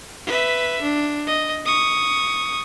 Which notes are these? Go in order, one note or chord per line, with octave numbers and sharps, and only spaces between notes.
B4 E5
D4
D#5
C#6 D#6